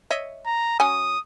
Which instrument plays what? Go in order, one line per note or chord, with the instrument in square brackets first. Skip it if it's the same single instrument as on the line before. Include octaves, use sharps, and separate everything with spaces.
[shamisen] C#5 D#5 E5
[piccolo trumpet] A#5
[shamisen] F#3 C#4 G#5 [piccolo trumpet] D#6